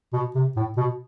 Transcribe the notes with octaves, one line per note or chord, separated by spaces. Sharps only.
B2
C3
A2
B2